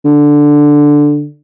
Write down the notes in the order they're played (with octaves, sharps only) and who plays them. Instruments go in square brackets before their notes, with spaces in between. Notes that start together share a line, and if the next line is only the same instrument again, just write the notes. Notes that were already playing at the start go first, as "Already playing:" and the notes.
[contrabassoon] D3